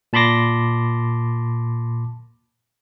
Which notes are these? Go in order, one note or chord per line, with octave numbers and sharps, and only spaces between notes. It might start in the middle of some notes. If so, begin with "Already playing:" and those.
A#2 A5 B5 C6 D6 A#6